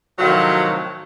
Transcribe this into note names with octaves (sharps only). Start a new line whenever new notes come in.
A2 C3 D#3 F3 F#3